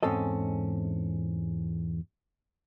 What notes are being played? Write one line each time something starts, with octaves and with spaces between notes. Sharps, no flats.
E2 G#2 C4 C#4 A4 D#5